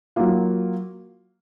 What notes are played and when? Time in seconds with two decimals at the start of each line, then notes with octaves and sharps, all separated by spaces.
0.16 F#3 A#3 F4